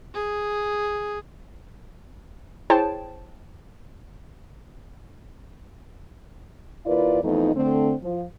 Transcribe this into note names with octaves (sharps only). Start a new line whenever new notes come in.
G#4
E4 G#4 C5 C#5 G5 A5
D#2 E4 F4 A#4 B4 D5
F2 E3 A3 B3 D#4
D3 A3 C4
F3